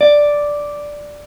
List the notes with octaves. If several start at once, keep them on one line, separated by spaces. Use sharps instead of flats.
D5